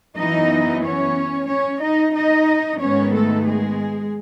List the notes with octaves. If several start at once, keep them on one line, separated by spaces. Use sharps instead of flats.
F#2 E3 B3 D#4 D#5
C#4 C#5
C#4 C#5
D#4 D#5
D#4 D#5
G#2 D#3 G#3 B3 C#4 C#5
A3 A4
G#3 G#4